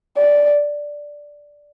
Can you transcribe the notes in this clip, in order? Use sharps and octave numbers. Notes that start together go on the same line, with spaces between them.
D5